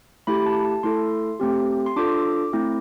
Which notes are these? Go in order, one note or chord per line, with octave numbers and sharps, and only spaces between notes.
A3 E4 G4 B5
A5
A5
A3 E4 A4 C6
A3 C4 G4
C6
D4 F4 A4 D6
A3 C4 E4